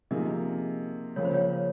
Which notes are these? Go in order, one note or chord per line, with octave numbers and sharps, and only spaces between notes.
C3 F3 A#3 D#4 G#4 D#5
C#3 F3 A#3 C#5
C5
C#5